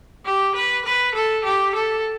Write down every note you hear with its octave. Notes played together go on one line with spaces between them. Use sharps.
G4
B4
B4
A4
G4
A4